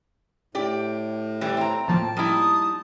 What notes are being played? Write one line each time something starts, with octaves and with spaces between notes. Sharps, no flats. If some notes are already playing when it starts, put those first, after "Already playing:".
A2 G4 D5
E3 G3 G5
C4 A#5
A2 F3 A#3 A5
G3 D#4 E4 D#6